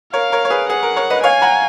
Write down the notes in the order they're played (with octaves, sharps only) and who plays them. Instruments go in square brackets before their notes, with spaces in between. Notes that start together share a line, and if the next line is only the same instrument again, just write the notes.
[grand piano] A#4 C#5 [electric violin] F5
[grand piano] A#4 C#5
C#5
G#4 B4
[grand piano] G#4 [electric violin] F#5
[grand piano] A#4
A#4 C#5
B4 D#5
[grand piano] C#5 F5 [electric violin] G#5
[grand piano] F#5 A#5